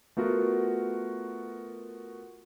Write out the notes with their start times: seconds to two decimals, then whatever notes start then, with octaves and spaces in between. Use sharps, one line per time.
0.17 A3 B3 F4 F#4 A#4